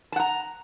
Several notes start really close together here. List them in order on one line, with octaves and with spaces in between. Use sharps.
A5 F#5 A#5